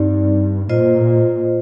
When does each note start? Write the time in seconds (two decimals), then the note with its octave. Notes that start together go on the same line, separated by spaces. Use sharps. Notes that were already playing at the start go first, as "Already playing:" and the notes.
Already playing: G2 C4 D#4 G4 D5
0.69 A#2 F4 C5 D#5